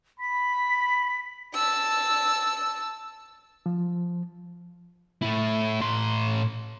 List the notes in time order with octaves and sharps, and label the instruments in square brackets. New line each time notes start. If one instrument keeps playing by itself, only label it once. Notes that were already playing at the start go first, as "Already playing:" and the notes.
[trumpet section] B5 [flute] B6
[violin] A5 E6
[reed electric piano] F3
[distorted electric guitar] A3 E4
A2 C6